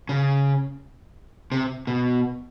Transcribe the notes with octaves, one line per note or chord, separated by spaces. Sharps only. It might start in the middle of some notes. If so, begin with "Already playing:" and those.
C#3
C3
B2